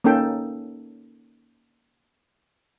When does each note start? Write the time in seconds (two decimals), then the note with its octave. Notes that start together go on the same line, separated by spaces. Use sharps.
0.04 A#3 C#4 D#4 A4 G5